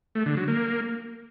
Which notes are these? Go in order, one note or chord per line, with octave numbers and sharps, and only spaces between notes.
A3
D3
F#3
A#3